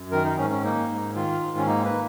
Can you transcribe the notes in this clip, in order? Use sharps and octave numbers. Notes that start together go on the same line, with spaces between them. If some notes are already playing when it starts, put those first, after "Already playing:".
Already playing: F#2
D#3 A#4
D#4
G#2 C#4
C#4
A#3 D#4
G#2
D#3 F4
G#2
C#4
A#3 D#4
B4